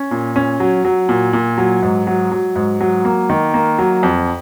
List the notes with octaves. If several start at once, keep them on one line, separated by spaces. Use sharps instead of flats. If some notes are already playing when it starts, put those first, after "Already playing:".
Already playing: C#4
A#2
C#4
F#3
F#3
A#2
A#2
F#3
G#2
F#3
F#3
G#2
F#3
A#3
D#3
A#3
F#3
F2